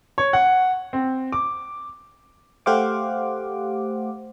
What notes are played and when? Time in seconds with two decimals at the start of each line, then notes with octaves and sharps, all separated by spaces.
0.18 C#5
0.33 F#5
0.93 C4
1.32 D6
2.66 A3 G4 C5 F5 F#5 D6